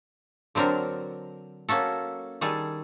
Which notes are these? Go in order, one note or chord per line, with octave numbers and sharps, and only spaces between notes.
D3 F#3 C4 D4 A#4
A#3 C#4 F#4 A4
D#3 G3 G#4 A4